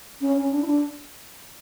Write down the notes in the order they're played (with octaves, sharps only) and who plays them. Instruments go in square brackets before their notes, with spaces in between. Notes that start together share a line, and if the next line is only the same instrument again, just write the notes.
[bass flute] C#4
C#4
D4
E4
D4